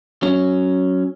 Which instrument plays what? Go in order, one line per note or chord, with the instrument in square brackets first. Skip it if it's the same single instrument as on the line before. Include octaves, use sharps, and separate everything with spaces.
[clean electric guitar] F#3 C#4